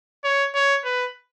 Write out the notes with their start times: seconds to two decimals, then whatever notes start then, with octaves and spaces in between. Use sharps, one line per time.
0.24 C#5
0.55 C#5
0.84 B4